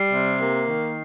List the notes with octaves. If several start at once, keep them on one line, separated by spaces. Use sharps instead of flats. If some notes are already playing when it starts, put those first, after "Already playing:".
Already playing: G3 C7
C3
A#3
D#3